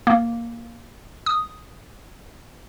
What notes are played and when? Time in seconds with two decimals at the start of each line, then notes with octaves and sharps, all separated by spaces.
0.07 A#3
1.26 D#6